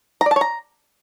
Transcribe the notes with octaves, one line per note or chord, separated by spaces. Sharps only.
A#5
D5
A5
C#5
A#5